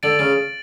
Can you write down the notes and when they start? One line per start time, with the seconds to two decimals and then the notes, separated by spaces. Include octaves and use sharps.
0.03 D3 A6 D7 F#7
0.19 C#3